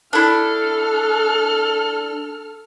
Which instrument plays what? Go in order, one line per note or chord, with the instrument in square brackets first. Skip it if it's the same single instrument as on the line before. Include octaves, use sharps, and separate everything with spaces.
[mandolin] D4 E4 [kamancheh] A4 F6